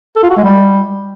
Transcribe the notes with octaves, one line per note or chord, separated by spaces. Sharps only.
A4
F4
F#4
G#3
G3